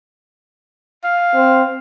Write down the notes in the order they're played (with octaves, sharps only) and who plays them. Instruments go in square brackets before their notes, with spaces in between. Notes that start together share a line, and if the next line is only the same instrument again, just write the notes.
[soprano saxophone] F5
[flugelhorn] C4